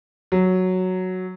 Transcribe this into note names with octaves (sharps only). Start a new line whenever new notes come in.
F#3